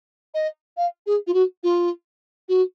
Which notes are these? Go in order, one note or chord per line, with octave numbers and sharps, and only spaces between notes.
D#5
F5
G#4
F4
F#4
F4
F#4